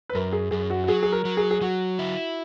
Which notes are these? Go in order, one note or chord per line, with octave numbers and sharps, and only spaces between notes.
B4
F#2 A#4
G#4
F#2 G#4
F#4
F#4
F#3 G#4
G#4
A#4
F#3
G#4
G#4
F#3 F#4
E4